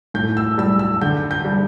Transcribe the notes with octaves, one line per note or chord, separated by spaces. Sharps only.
A2 G6
E6
G3 E6
E6
D3 G6
G6
G3